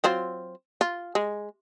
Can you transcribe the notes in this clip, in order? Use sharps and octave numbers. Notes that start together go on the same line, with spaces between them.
F#3 C4 F4
F4
G#3